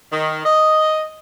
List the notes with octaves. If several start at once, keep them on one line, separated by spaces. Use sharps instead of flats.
D#3
D#5